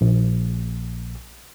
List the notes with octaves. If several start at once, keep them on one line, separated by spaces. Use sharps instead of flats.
A#1